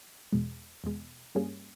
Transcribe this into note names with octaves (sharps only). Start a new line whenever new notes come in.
E2 B2 G#3
E2 B2 G#3
G2 G3 A#3 C#4 G#4